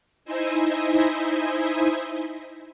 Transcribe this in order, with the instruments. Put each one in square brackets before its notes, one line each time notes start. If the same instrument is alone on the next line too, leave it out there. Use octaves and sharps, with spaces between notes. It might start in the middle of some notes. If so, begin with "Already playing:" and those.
[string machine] D#4 E4 C5 D#5 E5 G#5